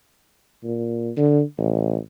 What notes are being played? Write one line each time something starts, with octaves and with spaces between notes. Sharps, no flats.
A#2
D3
A1